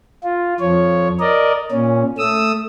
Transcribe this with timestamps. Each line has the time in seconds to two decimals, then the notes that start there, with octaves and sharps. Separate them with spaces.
0.23 F4
0.60 F2 F3 C#5
1.20 A#4 D5 D#5
1.72 A#2 C#4
2.18 A3 D#6 E6